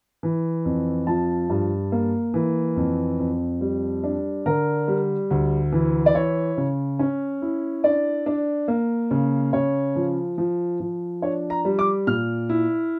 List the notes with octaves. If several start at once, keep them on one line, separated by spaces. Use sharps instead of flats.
E3
F2
F3 A5
G2
A#3
E3
F2
F2
G3
D4
D3 A#4
G3
D2
E3
D5
E4 C#5
C#3
C#4
E4
D4 D5
D4
A#3
C#3
C#3 C#5
F3
F3
F3
D4 C#5
A#5
G3
D6
A#2 F6
E4